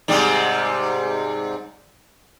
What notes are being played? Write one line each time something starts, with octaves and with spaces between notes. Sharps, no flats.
G#2 C3 G3